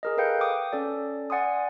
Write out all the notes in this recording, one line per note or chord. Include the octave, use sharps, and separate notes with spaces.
G#4 A#4 D#5
A4 B4 F5 G5 G6 C#7
G5 D6 D#6
C#4 A4 D5
D5 F#5 G#5 C6 D#6